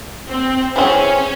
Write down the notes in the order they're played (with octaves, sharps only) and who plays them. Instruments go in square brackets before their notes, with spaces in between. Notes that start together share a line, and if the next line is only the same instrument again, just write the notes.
[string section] C4
[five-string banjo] E3 C4 E4 G#4 C#5 [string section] C#4